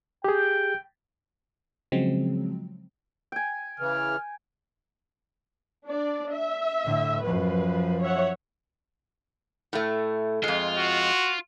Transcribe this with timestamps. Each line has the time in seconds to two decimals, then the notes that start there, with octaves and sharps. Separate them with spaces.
0.24 G4 G#4 G5
1.92 C#3 F3 F#3 G#3 C4
3.32 G5 G#5
3.80 C#3 E3 F6
5.87 D4 D5
6.32 E5
6.85 A2 D3
7.24 F#2 F3 B4
8.02 C#5 E5 F#5
9.73 A2 A3
10.44 F2 G#3 F4
10.78 F#4